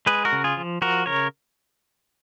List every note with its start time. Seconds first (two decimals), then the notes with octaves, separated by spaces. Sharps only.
0.06 G#3 G#4 B4
0.25 F#4 A#4
0.32 C#3
0.44 F4 G#4
0.57 F3
0.82 F3 F#4 A#4
1.06 C#3 A#4 C#5